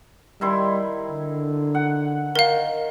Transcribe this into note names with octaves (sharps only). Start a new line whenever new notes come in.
D#3 G3 E4 C6
D3
F#5
D#3 A#4 F5